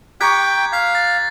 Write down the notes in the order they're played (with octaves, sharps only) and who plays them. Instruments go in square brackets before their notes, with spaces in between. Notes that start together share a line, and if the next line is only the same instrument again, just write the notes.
[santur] G4 A#5 C#6 [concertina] G5 [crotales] F#6 G#6 B6
[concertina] F5 [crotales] G#6 B6
[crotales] A6